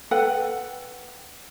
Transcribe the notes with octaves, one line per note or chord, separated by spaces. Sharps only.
A4 B4 F#5 G5